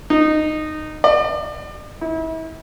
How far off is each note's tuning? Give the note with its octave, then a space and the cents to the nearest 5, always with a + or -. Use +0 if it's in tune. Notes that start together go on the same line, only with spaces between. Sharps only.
D#4 -15
D5 +40
E4 -35